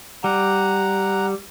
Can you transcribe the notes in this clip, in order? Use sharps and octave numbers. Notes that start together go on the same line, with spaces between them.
G3 F#5 A#5